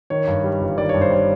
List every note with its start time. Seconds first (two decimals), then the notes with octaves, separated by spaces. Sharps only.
0.10 D#3 C#5
0.27 G2
0.44 G3
0.61 G1
0.77 D#3 D5
0.89 C#5
0.94 G2
1.01 C5
1.11 G3 C#5